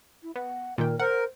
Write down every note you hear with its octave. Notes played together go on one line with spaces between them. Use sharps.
E4
B3 F#5
A#2 D#3 A#4 G5
A#4 C5 F#5